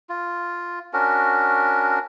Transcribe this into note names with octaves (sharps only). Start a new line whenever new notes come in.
F4
C#4 D4 F#4 A#4